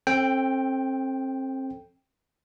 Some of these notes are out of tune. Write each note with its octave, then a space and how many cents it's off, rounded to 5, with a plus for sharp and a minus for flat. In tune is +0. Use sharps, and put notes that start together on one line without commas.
C4 +30 A4 +0 G5 +0